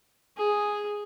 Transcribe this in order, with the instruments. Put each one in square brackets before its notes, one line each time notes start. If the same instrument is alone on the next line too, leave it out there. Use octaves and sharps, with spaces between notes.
[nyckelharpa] G#4